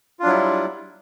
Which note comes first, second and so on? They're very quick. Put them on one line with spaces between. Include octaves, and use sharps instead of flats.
F4 D4 F#3 E4 G3